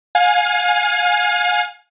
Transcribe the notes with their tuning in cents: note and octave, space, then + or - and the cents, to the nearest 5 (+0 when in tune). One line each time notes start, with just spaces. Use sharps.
F5 +35 G#5 +0